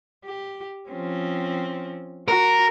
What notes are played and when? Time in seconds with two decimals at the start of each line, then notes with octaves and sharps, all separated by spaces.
0.25 G4
0.90 F3 C4 C#4
2.28 F#4 A#4